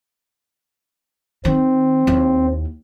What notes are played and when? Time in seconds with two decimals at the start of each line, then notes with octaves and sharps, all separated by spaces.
1.45 D#3 C4
2.07 D#2 E4